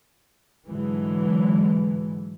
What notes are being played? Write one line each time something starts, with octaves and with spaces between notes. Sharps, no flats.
G#2 D3 E3 F#3 G#3